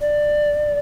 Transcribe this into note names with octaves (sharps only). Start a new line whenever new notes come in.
D5